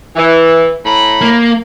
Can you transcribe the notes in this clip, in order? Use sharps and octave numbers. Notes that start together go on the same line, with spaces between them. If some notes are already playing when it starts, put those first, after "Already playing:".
E3
A2 A#5 B5
A#3